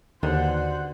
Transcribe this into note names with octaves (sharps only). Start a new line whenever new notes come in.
D#2 D3 F#4 B4 C5 D5 F#5